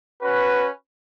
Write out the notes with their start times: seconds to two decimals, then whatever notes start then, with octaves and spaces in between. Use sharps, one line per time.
0.22 C#4 F#4 B4